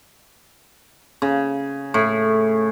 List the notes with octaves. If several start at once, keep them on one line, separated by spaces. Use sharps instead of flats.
C#3
A2